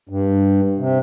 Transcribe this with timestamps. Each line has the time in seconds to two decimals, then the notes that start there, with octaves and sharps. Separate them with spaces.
0.09 G2
0.78 C3